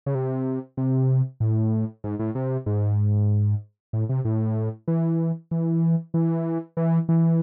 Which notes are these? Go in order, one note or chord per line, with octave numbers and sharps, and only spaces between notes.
C#3
C3
C3
A2
G#2
A2
C3
G#2
A2
C3
A2
E3
E3
E3
E3
E3